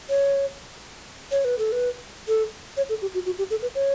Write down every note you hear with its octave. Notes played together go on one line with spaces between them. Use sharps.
C#5
C#5
B4
A4
B4
A4
C#5
A4
G4
F#4
F#4
G4
A4
B4
C#5